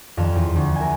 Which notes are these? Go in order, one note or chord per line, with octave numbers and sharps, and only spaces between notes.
D#1 F2 C4 F5 F#6
E2
D2
A#4 E5 G#5